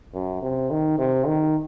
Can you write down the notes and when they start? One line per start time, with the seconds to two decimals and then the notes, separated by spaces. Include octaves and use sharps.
0.14 F#2
0.42 C3
0.70 D#3
0.99 C3
1.26 D#3